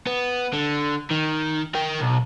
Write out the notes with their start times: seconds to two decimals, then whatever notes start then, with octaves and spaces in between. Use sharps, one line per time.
0.07 B3
0.53 D3
1.11 D#3
1.75 A#4 G5
2.01 B1